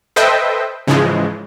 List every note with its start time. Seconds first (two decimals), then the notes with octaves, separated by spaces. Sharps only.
0.16 A4 B4 C5 D#5 E5 G5
0.87 G#2 C#3 E3 F3 G#3